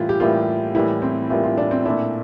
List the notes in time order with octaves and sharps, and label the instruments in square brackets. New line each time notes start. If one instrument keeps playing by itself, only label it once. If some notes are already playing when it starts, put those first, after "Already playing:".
Already playing: [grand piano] A2 E3 G3 A#3 [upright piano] E4 F4
[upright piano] G4
[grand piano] A2 E3 G3 A#3 [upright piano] F4
[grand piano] A2 E3 G3 A#3 [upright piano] E4
[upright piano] C4
[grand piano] A2 E3 G3 A#3 [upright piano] F4
[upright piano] F4
D4
C4
[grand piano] A#2 A3 E4 [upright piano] D4